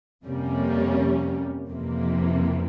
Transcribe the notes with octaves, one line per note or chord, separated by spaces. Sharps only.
F2 C3 G3 A#3 C#4
F2 C3 E3 A#3